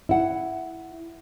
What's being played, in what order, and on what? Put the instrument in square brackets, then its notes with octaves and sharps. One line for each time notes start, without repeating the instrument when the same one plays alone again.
[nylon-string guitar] E4 F#5